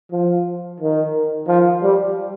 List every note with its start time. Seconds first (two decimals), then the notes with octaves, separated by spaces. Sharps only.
0.12 F3
0.80 D#3
1.48 F3
1.83 G3